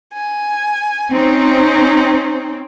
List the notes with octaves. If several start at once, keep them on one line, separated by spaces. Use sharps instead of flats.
G#5
C4 C#4 D#4